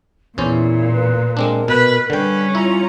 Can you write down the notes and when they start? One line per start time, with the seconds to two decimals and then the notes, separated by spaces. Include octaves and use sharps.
0.38 E2 A#2 C#4 E4 C5
0.92 B4
1.37 G#3 C4 D4 A#4
1.68 B2 B4
2.10 D3 G3 C#4 B4 G5
2.55 E4 F4 A#5